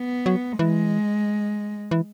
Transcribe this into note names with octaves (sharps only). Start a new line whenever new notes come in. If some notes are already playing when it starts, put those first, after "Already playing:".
Already playing: B3
F#3
E3 G#3
E3